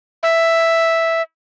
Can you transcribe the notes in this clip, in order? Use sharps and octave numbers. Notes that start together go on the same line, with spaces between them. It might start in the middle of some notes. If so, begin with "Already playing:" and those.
E5